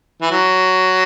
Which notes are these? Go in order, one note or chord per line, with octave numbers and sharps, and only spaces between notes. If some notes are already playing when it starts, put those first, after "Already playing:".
E3
F#3